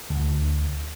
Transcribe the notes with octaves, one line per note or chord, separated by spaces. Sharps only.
D2